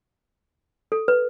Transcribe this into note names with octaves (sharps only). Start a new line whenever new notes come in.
A4
B4